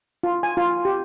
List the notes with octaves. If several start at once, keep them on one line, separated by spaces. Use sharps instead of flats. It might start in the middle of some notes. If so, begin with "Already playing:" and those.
F4
G#5
F4
G4